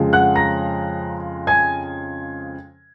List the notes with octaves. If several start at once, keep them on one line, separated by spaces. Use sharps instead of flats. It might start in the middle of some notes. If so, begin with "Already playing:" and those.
Already playing: F2 C#3 F3 G#3
F#5 F#6
A#5 A#6
G#5 G#6